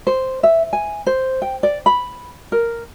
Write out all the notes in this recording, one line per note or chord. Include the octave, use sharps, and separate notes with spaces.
C5
E5
G#5
C5
G5
D5
B5
A#4